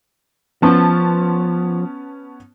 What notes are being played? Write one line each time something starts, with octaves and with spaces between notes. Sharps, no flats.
F3 B3 C#4 A5